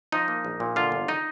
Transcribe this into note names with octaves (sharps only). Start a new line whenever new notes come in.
F3 D#4 D#5
A#3
A#1
A#2
D3 F4 F5
G1
D#4 D#5